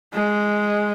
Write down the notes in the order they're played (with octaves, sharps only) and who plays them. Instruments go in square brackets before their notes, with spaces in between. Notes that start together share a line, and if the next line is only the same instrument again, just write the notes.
[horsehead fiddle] G#3